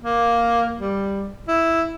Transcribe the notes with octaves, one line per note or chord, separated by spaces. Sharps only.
A#3
G3
E4